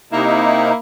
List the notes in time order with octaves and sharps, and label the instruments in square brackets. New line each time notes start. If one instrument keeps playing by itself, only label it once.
[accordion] C3 D#4 [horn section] A#3 E4